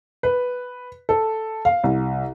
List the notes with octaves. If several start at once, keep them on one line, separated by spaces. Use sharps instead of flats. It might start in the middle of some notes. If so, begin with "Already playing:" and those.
B4
A4
F5
C2